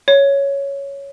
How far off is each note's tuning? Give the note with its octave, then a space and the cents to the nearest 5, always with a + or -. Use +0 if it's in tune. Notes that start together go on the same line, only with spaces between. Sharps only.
C#5 +5